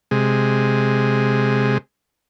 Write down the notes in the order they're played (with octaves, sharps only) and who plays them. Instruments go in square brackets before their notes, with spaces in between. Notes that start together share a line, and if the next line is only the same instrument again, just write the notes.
[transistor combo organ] C3 G#3